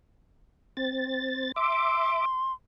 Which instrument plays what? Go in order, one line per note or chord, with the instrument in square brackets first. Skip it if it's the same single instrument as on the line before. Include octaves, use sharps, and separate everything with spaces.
[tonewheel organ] C4 A6
[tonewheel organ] E5 D6 [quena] C6